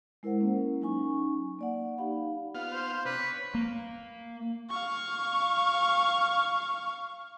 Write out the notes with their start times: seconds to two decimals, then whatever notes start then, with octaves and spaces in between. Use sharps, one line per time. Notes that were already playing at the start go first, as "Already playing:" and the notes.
0.23 G#3 E4 A#4 C5 F#5
0.40 A#3 C#4
0.81 F#3 C#4 D#4 G#5 C#6
1.59 A#3 D5 F#5
1.98 D#4 G4 F5 B5
2.55 B3 F4 F5
2.71 C5
3.05 C3 D4 B4
3.20 C#5
3.55 A#3
4.70 F5 C#6